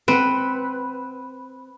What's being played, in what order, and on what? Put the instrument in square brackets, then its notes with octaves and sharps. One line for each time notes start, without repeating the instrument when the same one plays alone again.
[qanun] C4 F#5 [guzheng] B4